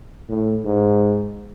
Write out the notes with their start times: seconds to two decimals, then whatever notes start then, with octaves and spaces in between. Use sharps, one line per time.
0.29 A2
0.65 G#2